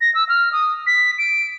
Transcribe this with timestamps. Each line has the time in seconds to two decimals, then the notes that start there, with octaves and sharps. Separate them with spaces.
0.01 A#6
0.14 E6
0.29 F6
0.52 D#6
0.87 B6
1.18 D7